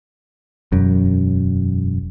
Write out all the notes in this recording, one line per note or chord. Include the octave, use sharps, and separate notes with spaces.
E1 F#2